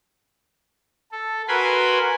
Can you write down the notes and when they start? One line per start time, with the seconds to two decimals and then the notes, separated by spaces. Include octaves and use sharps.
1.12 A4
1.48 F#4 A#4 B4 G#5 B5 C6